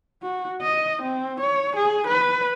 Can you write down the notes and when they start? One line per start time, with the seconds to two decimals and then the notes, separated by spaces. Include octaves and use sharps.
0.22 F#4
0.62 D#5
1.02 C4
1.40 C#5
1.76 G#4
2.07 B4